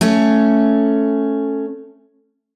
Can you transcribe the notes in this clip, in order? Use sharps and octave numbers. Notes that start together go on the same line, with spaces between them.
A3 C#4